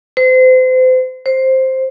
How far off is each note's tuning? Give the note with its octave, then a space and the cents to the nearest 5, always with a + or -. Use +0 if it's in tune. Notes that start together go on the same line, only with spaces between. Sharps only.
C5 -35
C5 +5